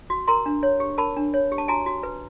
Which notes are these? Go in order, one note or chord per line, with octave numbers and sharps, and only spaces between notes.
F#4
A#4 A#5 C6
D4
C#5
G4
A#4 A5 B5
D4
C#5
G4
A5
F#4 G#5 A#5
F#4
B4